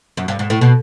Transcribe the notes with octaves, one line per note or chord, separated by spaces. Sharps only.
F#2
G2
G#2
A2
B2